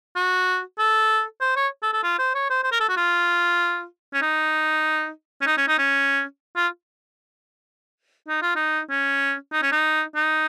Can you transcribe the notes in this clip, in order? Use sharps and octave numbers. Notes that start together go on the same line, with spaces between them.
F#4
A4
C5
C#5
A4
A4
F4
C5
C#5
C5
C5
A#4
A4
F#4
F4
C#4
D#4
C#4
D#4
C#4
D#4
C#4
F4
D#4
F4
D#4
C#4
D#4
C#4
D#4
D#4